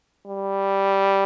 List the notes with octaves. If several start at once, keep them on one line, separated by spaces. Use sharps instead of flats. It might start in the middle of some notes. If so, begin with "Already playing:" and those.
G3